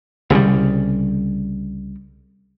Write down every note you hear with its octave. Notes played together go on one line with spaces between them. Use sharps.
C2 C#3 F#3 G3